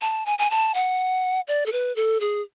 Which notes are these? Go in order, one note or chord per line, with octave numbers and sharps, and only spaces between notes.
A5
G#5
G#5
A5
F#5
D5
A4
B4
A4
G#4